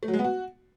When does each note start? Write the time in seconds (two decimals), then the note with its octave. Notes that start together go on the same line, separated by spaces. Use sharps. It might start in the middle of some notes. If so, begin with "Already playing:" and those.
0.03 A3
0.08 F#3
0.14 G#3
0.19 B3
0.24 F#4